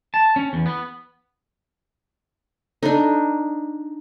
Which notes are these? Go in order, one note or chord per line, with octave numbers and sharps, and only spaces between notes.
A5
C#4
E2
B3
D4 D#4 A4